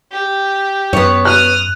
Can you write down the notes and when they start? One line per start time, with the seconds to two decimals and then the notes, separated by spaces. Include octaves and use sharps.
0.11 G4
0.93 F#2 B3 C#5
1.25 D#6 F6 F#6